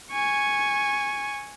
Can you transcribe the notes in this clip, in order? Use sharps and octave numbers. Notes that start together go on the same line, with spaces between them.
G#5 C#6